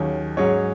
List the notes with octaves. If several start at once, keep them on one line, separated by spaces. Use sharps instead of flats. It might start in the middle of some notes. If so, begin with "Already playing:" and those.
Already playing: D#2 D#3 F#3 C#4 G#4
G#2 F#3 C#4 G#4 C#5